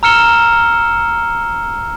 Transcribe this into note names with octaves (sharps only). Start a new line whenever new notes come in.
A#5 E6 F6 C#7 E7 G7